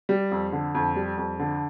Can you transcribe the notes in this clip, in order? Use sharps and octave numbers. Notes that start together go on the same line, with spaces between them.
G3
F2
D3
F2
G3
F2
D3